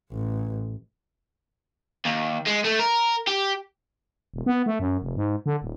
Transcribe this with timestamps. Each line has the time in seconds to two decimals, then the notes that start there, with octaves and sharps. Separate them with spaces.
0.12 A1
2.05 D#2
2.47 G#3
2.65 A3
2.80 A#4
3.28 G4
4.34 E1
4.46 B3
4.66 A3
4.80 F#2
5.02 F1
5.16 G#2
5.46 D3
5.62 D#1